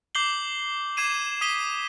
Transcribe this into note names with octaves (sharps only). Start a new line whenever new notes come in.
D6 G6 C7 F#7 G7
D6 G#6 C7 D#7 E7
D#6 B6 D#7 G7